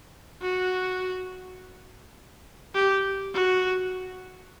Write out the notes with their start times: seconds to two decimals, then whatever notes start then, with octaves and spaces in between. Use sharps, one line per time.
0.42 F#4
2.75 G4
3.34 F#4